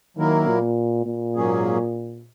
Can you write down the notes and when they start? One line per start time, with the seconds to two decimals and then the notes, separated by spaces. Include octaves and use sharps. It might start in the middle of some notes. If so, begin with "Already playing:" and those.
0.17 D#3 F#3 A#3 E4 A#4
0.47 A#2
1.06 A#2
1.36 G#2 F#3 A#3 C#4 G#4